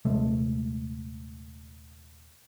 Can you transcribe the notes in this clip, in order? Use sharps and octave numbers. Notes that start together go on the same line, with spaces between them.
D#1 C3 G#3 A3